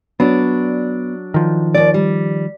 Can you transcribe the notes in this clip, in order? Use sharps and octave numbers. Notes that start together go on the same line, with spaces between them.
F#3 B3 D4
D#3 F3
D#2 D5
G3